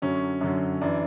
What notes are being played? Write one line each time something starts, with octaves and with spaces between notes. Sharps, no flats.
F#2 D3 F#3 C#4
F#2 D3 F#3
F#2 E3 D4